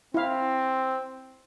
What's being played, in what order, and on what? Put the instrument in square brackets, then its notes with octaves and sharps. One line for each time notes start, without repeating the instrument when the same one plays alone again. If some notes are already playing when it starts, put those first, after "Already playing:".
[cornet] C4 [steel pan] E4 F5